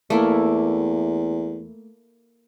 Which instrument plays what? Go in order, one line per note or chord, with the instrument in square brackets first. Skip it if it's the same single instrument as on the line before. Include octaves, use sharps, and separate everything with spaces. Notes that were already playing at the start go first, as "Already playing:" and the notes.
[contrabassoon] E2 [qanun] A3 A#3 E4